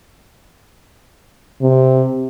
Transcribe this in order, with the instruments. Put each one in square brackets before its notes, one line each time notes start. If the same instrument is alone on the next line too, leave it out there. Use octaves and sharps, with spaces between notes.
[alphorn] C3